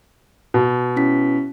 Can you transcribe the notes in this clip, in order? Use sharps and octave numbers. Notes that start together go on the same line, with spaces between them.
B2
C#4 E4 B6